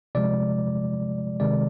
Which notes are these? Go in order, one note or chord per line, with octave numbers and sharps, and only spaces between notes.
C3 F3 G#3 D5
C3 D#3 G#3 D5